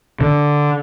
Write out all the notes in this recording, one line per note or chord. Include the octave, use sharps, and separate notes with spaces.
D3